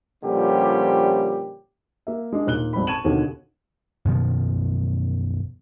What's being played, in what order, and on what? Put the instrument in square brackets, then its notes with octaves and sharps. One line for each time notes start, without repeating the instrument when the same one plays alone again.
[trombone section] A#2 D3 F3 G3 C#4 G4
[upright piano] A#3 E5
G#3 D4
D#2 A#2 F#6 G7
G#1 F2 C4 B5
A5 C#6 G#6 D#7 E7 F#7
D#2 B2 D3
[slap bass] F#2 B2 D#3 F3